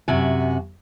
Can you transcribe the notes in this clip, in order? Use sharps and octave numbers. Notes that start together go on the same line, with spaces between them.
F#2 C3 F#4 G#5